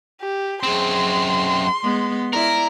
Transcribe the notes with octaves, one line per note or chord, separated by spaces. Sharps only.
G4
F#2 C4 G#4 C6
G#3 B3
E4 A#4 D5